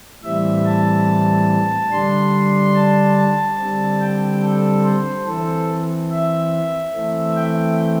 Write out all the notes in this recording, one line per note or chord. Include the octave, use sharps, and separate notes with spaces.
A2 E3 G3 C4 E5
A5
D3 G3 D4 C6
A5
A5
D3 G3 C4
G5
A4
C5
E3 C4 A4
E5
E3 A3 C4
G5